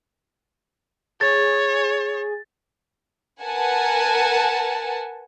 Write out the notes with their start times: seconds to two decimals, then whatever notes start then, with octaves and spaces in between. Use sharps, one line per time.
1.21 G#4 C#5 A6
3.42 A#4 B4 F#5 G#5 A5